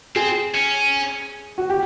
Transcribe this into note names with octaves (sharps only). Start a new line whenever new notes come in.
C4 G#4
C#4
F#4
G4